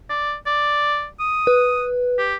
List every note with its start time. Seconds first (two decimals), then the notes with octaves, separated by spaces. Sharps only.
0.10 D5
0.46 D5
1.20 D#6
1.47 B4
2.18 G4